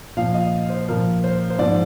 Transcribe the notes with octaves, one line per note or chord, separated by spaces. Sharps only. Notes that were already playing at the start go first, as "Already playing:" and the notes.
A#2 F3 F5
D#5
C5
A#2 F3 A#4
C5
C5
G#2 F3 D5